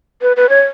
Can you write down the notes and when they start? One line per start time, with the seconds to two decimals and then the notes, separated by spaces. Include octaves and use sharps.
0.22 B4
0.37 B4
0.49 C#5